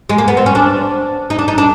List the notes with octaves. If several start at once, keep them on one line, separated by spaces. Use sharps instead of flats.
G#3
A#3
B3
C4
C#4
D4
D#4
D4
D#4
D4